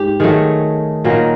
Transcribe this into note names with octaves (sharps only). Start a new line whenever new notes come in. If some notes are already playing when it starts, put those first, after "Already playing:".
Already playing: G#2 G4
D#3 F#3 A3 G#4
A#2 F#3 A#3 D#4